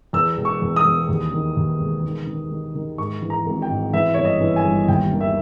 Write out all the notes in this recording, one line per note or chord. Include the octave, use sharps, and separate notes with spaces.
E2 E6
E1
C#6
E2
D#6
E2
D#2
D#3
D#2
E1
D#3
D#3
D#3
D#3
G#2 C#6
E3
A#5
G#1
G5
G#2
E3 E5
G1 C#5
D#5
E3
G#5
G1
D#2 G5
D#3
E5